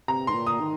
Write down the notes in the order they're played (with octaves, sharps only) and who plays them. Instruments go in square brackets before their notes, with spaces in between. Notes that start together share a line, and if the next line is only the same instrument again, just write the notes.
[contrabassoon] C3 [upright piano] A#5
[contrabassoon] G#2 [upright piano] C6
[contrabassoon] A#2
[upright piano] D#6
[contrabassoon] D#3